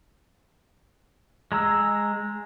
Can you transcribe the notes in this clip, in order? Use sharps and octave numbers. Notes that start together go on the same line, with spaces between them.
G#3 A#5 E6